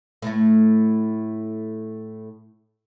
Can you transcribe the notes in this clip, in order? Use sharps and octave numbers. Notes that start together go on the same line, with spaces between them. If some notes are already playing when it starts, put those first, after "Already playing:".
A2 A3